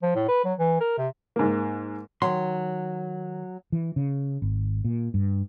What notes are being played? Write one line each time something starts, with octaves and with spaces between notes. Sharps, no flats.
F3
A2
B4
F#3
E3
A#4
C3
G#2 A#3
D#3 F#3 C6
E3
C#3
G#1
A#2
G2